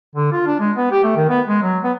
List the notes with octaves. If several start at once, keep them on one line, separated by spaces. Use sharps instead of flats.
D3
F4
D4
G#3
B3
G4
A3
D#3
B3
G#3
F#3
B3